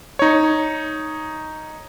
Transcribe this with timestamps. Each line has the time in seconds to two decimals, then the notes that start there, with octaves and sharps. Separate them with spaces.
0.19 D#4 C#5